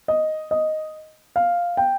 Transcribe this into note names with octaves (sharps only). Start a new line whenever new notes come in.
D#5
D#5
F5
G5